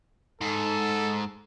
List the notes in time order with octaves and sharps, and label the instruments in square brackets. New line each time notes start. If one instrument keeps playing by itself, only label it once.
[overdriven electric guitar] G#2 [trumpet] A4